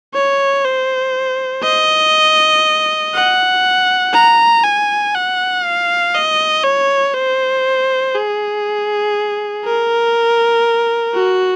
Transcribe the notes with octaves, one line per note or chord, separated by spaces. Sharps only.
C#5
C5
D#5
F#5
A#5
G#5
F#5
F5
D#5
C#5
C5
G#4
A#4
F#4